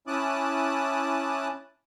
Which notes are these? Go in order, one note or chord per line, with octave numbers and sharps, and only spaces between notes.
C#4 E4 A5 D6 D#6 F#6